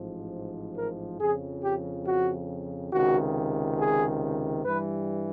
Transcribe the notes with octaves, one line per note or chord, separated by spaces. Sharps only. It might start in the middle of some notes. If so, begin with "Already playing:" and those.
Already playing: A1 G#2 F3
A#4
F2 C#3 F3 G#4
G4
F#4
C#2 C3 D#3 F#4
G#4
G2 E3 G3 B4